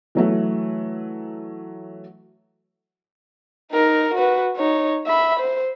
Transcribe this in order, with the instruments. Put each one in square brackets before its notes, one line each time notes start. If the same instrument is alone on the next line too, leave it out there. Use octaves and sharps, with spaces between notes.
[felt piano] E3 F#3 A3
[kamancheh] D#4 A#4
F#4 B4
D#4 C#5
E5 B5
C5